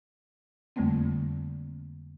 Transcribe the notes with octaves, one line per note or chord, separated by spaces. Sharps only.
F2 D3 G3 A3 A#3 C4